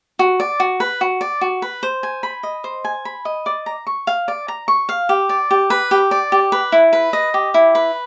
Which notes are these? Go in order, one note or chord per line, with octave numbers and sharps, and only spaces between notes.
F#4
D5
F#4
B4
F#4
D5
F#4
B4
C5
G#5
B5
D#5
C5
G#5
B5
D#5
D5
A#5
C#6
F5
D5
A#5
C#6
F5
G4
D5
G4
B4
G4
D5
G4
B4
E4
B4
D#5
G4
E4
B4